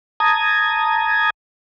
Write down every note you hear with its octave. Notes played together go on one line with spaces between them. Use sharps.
A5 A#5 D#6 G#6